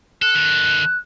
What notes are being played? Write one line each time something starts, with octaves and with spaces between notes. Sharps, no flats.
A4 F#6
D#3 A4